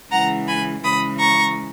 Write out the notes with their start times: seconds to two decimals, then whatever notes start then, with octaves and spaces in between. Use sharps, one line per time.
0.11 C#3 E3 G#3 F#5 A#5
0.48 G#5 B5
0.84 C#3 E3 G#3 B5 D#6
1.20 A#5 C#6